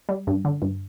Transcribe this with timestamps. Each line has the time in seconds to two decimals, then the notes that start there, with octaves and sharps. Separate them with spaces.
0.09 G3
0.27 G2
0.45 D3
0.62 G2